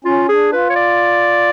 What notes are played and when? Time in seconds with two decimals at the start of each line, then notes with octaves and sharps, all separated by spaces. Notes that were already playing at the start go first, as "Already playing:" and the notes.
0.05 C#4 F4
0.28 D4 G#4
0.52 F4 B4
0.70 C#5
0.76 D5